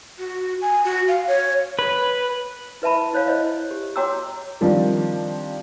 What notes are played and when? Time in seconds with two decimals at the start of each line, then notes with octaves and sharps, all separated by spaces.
0.19 F#4
0.62 G#5
0.84 F#4
1.08 F5
1.28 C#5
1.79 B4
2.82 E4 B4 E5 A5 B5
3.13 E4 C5 C#5 F5
3.28 E4 C5 D#5
3.71 G4
3.96 F#4 C#5 G5 A#5 D6 E6
4.61 D#3 F3 G3 C4 D4